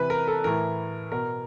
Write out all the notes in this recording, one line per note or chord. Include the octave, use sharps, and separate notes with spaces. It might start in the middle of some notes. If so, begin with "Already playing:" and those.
Already playing: C3 E3 B4
A#4
A4
A2 E3 A#4
B2 A#4